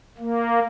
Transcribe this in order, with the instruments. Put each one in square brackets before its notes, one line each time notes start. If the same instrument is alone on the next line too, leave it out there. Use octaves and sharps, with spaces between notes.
[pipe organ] A#3